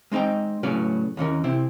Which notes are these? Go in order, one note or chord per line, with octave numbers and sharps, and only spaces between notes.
G#3 C4 D#4 C5 G5
A2 C#3 F#3 C#4 B4 D5
D#2 E3 C#4 A#4
C3 C4 E4